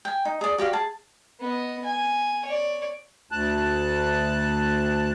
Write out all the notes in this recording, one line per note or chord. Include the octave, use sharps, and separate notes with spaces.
G5 G#5
D#4
G#4 D5
F#4 G4 D5 F5
G#4 A5
B3 D#5
G#5
C#5 D5
D2 A5 F#6